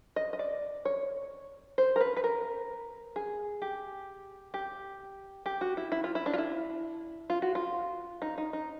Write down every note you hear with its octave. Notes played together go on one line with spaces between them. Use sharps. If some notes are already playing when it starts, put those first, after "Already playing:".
D#5
D#5
D5
C#5
C5
A#4
B4
B4
A#4
G#4
G4
G4
G4
F#4
E4
E4
F4
E4
D4
F4
E4
F4
F#4
F4
D#4
D#4
D#4